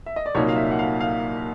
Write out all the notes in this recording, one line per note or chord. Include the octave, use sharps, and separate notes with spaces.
E5
D#5
D5
C2 A#2 F#3 A#3 D#4 C#5
F5
E5
F#5
F5
F5